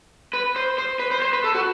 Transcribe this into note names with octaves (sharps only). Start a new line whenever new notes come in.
B4
C5
C5
B4
C5
C5
B4
A4
F#4